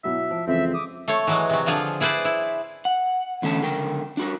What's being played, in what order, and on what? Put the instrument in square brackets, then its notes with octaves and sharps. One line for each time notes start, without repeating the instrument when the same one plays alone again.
[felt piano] B2 F#3 E4 [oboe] E5
[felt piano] F3
[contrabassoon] F2 [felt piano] C#3 E3 G#3 [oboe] C4 [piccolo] E5
[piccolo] D6 [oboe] D#6
[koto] A3 C#5
E3 F#3 G#3
C3 F#3
D3 F3 F4 G#4
E4 G#4 B4 C5 D5
E4
[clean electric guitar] F#5
E2 D3 A3 C#4 A5
C#2 D3 A#4 G5
D4 F#4 A#4